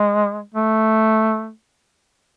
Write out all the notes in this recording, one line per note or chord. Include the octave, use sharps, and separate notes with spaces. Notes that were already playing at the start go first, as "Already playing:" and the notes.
Already playing: G#3
A3